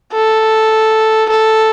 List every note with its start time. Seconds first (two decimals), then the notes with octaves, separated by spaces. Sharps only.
0.13 A4
1.29 A4